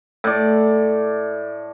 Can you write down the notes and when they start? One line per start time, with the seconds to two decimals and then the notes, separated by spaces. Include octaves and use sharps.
0.24 A2 D5